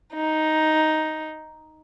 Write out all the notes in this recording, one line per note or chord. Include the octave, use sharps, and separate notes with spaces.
D#4